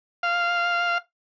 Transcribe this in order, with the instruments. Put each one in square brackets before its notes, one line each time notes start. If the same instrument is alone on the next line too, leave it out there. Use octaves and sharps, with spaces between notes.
[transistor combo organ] F5